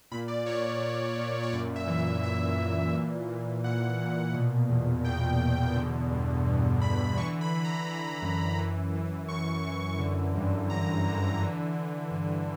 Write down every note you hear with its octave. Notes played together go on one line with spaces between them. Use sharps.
A#2 B5
D5
A#2 C#5
A#2
A#2
C#5
F#2 D5
E5
E3
E5
F#2 E5
E3
A#2
A#2
A#2 F#5
A#2
B2
E2
B2 G5
E2
D3
G2
G2
D3 B5
E3 C#6
B5
E3
A#5
E3
F#2
E3
E3
F#2 C#6
E3
D3
G2
D3 A#5
D3
E3
E3
G2